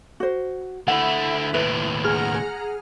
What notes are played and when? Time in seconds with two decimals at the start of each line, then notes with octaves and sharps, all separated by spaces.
0.20 F#4 C5
0.88 D3 A3 E4 F#5
1.54 D#2 A2 B4
2.04 G#4 F#5 A#5 F6
2.34 G#4